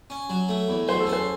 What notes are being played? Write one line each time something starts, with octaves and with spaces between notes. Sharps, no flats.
C#4
F#3
A3
E2
F#3 C5
A4
C#4
C5